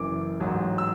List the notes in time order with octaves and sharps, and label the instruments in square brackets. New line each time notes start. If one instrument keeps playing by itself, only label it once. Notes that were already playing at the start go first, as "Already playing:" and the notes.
Already playing: [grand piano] F#1 F#2 E3 D6
A1 G#2 F#3
E6